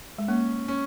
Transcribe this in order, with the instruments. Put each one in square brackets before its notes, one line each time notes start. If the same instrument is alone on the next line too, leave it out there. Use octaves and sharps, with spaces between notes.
[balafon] G#3
[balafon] A#3 [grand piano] C#4
[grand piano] C#4